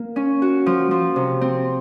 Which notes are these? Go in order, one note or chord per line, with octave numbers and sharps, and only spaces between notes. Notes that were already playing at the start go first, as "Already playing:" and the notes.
Already playing: A#3
C#4
F#4
F3
F3
C3
C4